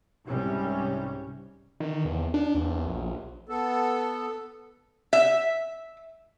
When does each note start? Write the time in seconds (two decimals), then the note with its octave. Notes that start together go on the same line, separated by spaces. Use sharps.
0.25 C2 G#2 C3 G3 C#4
1.80 D#3
2.05 E2
2.34 D4
2.55 E2
2.86 A#1
3.49 B3 A4
5.13 E5